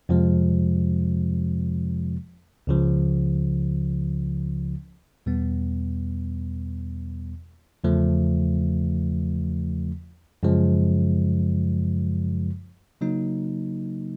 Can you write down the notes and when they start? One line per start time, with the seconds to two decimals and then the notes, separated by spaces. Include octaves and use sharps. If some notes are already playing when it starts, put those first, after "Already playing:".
0.09 F2 C3 F3 G#3
2.67 C#2 C#3 F3
5.26 E2 B2 G3 B3
7.84 E2 C#3 F3 A3
10.43 F#2 C#3 F3 G#3
13.01 C#3 F#3 A#3 D#4